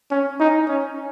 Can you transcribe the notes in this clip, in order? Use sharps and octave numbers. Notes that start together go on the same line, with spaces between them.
C#4
D#4
C#4